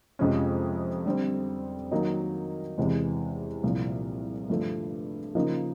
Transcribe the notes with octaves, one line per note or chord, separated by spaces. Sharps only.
F2 C3 F3 G#3 C#4
D3 G3 C4
D#3 F#3 A#3 D#4
E2 C3 E3 G#3
C2 A#2 F3
G2 D3 F3 A3
C#3 F3 A#3 D#4